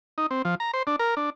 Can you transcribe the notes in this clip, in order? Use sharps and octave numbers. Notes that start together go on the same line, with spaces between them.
D#4
C4
F3
A#5
C5
D4
A#4
D4